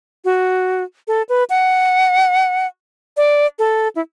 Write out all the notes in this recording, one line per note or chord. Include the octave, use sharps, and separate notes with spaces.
F#4
A4
B4
F#5
D5
A4
E4